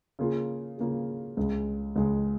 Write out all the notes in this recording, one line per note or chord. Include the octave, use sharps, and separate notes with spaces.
C#3 A#3 F4 G#4
C#3 A#3 F4 G#4
C#2 C#3 G#3
C#2 C#3 G#3